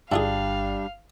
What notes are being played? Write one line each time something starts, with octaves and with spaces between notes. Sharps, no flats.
G1 G3 D4 E4 F4 G#4 F5